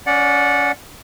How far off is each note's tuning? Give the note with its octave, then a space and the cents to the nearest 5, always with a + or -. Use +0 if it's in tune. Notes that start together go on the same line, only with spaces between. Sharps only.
C#4 +25 D5 +0 F#5 -15